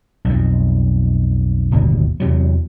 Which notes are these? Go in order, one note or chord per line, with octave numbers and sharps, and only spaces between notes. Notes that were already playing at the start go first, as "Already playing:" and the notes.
B1 F2
D1 G1 D#2 B2
E2 C3 F#3